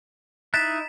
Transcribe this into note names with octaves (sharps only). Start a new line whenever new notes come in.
D#4 E4 F#6 A6 B6 E7